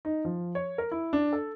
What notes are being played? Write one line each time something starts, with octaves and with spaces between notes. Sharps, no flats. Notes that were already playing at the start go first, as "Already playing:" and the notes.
D#4
F3
C#5
A#4
E4
D4
A4